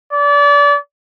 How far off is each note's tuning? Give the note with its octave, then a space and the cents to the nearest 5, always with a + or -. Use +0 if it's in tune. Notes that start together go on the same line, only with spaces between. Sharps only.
D5 -30